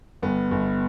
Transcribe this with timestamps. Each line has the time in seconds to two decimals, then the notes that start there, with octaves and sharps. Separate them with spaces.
0.22 G1 B3
0.51 G1